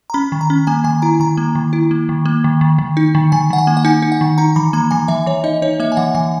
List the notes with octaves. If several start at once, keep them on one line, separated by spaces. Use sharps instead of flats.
A#5
C#4 B5
D#3
A#5
C#4
A#3 G#5
D#3 G#5
E4 A#5
D#3 A#5
A#3
D#3
E4
A#3
D#3
A#3
D#3
D#3
D#3
D#4
D#3
D#3 G#5
D#3 F#5
G#5
A#3
F#5
D#4 G#5
D#4
F#5
D#3
D#4 A#5
E3 B5
A#3 A#5
E3 G#5
E3 E5
E3 C#5
D#4 D#5
D#4 C#5
A#3 E5
G#5
E3 F#5
E3 G#5